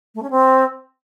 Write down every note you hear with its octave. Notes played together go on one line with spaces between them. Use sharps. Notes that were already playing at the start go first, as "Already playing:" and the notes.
A3
C#4
C4